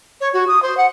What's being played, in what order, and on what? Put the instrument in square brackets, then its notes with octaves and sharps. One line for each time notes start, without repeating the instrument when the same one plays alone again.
[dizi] C#5
F#4
D#6
C5
F#5